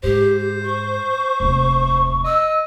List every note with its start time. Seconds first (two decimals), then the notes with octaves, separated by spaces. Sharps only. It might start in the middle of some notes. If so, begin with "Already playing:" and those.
0.03 G#2 G4 C5
0.63 C#6
1.40 F1 D#2
2.24 D#5 E6